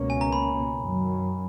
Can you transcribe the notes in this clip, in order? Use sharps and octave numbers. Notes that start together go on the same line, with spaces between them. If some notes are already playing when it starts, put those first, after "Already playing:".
Already playing: C#2 B2 A#3 C#4
G#5
A#5
B5
F#2 D#3 F#3